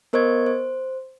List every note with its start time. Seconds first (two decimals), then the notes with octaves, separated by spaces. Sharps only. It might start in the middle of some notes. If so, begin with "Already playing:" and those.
0.13 B3 A#4 C5 D#5 C#6 G#6
0.47 C5